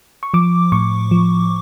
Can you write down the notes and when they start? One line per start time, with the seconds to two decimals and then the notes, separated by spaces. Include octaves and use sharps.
0.23 C#6
0.34 F3 D6
0.72 A2 C#6
1.11 F3